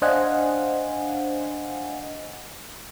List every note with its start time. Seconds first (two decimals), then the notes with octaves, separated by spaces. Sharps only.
0.02 D4 C5 D#5 F5 F#5 G#5